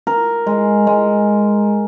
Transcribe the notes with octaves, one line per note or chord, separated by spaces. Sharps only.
A#4
G#3
G#3